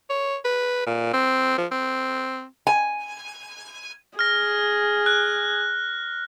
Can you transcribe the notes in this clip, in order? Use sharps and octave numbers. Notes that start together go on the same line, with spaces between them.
C#5
B4
A#2
C4
F3
C4
G#5
G#4 F6 A#6
F#6